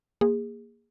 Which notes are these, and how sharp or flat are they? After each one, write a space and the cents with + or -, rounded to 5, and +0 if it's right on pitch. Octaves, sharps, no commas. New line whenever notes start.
A#3 +0 G#4 -20